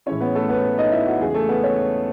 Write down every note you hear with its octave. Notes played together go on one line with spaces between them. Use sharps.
A2 E3 G#3 C#4 E4 C#5
B3 B4
A3 A4
B3 B4
D#4 D#5
E4 E5
F#4
E2 C#3 G#3 G#4
G#4
A3 A4
B3 B4
C#4 C#5